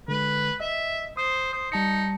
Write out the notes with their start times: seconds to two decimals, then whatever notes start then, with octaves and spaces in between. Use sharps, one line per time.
0.08 D3 G#3 B4
0.61 D#5 E5
1.17 C5 D#6
1.53 C5 D#6
1.72 G3 D#4 A5 C#7